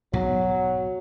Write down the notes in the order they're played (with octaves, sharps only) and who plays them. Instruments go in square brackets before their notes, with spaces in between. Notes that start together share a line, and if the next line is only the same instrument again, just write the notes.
[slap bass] B1 G#2 [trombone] F#3